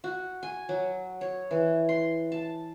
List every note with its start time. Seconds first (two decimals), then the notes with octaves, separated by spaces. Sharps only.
0.04 F#4
0.43 G#5
0.69 F#3
1.21 C#5
1.51 E3
1.89 C6
2.32 A5